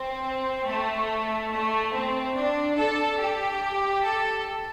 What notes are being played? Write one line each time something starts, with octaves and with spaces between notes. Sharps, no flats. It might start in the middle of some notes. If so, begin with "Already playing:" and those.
Already playing: C4
A3
A3
C4
D4
A4
G4
A4